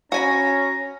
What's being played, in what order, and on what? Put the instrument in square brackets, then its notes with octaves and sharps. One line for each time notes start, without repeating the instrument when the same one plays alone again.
[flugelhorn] C#4 [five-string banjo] F#4 G#5 B5 [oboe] A#5